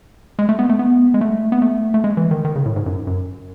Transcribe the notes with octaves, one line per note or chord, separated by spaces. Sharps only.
G#3
A3
B3
A3
B3
G#3
A3
B3
A3
A3
G#3
E3
D#3
D#3
C#3
A2
G#2
F#2
F#2